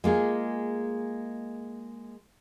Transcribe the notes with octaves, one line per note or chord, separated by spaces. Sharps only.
G#3 A#3 F4 G#4